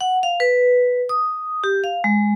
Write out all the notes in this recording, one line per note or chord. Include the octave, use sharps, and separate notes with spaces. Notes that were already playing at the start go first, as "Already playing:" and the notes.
F#5
F5
B4
D#6
G4
F5
G#3